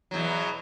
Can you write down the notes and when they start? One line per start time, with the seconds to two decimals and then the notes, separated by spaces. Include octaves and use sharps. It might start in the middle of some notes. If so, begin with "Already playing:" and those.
0.11 F#3
0.14 E2
0.16 B2